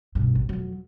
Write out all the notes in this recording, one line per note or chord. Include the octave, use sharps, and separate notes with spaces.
G2 B2
A1
F2 F#3